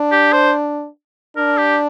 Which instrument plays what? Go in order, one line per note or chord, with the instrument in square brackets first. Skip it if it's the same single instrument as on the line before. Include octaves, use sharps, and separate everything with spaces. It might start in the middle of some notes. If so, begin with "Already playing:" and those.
Already playing: [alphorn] D4
[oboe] G4
C5
[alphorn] D4 [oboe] A#4
[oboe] G4